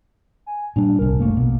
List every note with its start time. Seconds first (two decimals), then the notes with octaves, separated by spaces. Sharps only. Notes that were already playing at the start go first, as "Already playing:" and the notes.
0.46 G#5
0.76 A#2 G3 D4
0.99 D1 C2 A#4
1.20 F#1 A3 A#3 D4
1.37 A#1 B2